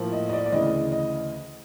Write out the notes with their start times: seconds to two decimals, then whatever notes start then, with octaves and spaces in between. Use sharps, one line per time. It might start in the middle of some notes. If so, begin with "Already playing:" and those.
Already playing: A2 F3 A#3
0.13 D#5
0.29 D#5
0.33 D5
0.46 D5
0.52 D2 C#3 E3 D#5
0.92 D#5